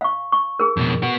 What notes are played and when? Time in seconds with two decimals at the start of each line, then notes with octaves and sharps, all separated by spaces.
0.01 F5 C#6
0.32 C#6
0.59 G#4 A#4
0.77 F2 B2
1.02 B3 F#4